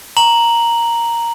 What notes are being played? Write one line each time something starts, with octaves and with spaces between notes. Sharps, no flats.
A#5 F#7